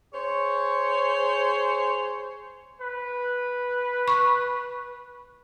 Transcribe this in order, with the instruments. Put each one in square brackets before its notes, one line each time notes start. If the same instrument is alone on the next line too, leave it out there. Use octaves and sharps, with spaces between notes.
[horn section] G#4 C5 C#5
[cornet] B4
[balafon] C#6